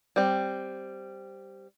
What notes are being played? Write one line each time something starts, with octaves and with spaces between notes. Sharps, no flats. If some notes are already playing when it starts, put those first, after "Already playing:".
G3 C4